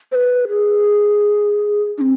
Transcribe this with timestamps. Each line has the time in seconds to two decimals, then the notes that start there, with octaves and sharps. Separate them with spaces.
0.12 C5
0.15 B4
0.49 G#4
1.98 D4
2.01 C4